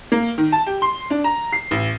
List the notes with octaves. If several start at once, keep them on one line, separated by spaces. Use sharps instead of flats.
A#3
D#3
A5
G4
C6
D4
A#5
C7
A1